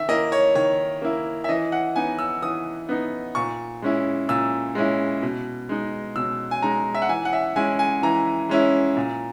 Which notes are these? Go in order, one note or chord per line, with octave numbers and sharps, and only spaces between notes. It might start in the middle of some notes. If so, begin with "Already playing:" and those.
Already playing: D#3 E5
A#3 E4 D#5
C#5
D#3 C#5
A#3 E4
E5
E3 D#5
F#5
B3 D#4 G#5
E6
E3 D#6
B3 D#4
A#2 C#6
G#3 C#4 E4
A#2 E6
G#3 C#4 E4
B2
G#3 D#4
B2 E6
G#5
G#3 D#4 A#5
E5
F#5
E3 G#5
F#5
E5
G#3 C#4 E4 G#5
G#5
E3 A#5
G#3 C#4 E4
A#2